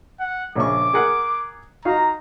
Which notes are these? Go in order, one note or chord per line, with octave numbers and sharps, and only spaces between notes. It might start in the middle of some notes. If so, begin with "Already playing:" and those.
F#5
A#1 C#3 C#6 D6
G#4 A#4 F#5
D#4 F#4 F5 A#5